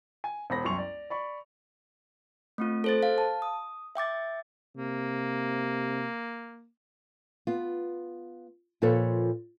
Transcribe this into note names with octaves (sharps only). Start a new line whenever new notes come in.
G#5
E1 C5 B5 A#6
C2 F#2 C6 C#6 F7
D5
D5 B5 C#6
A3 C4 F4
A4 C5 A6
F5
A5
D#6
E5 G5 D6 A6
C3 A#3
B3 F4
A#2 F3 F4 A4 B4 C#5